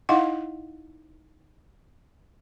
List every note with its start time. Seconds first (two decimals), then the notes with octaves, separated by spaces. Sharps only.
0.09 D#4 E4 D#5 F5 F#5